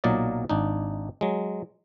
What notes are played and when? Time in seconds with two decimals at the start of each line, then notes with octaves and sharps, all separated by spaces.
0.04 B1 A#2 F#3 A#3 D5 D#5
0.49 G#1 D4 D#4
1.21 F#3 G#3